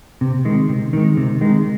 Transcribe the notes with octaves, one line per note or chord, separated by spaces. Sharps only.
C3
D#3 G#3
C3
D#3 G#3
C3
D#3 G#3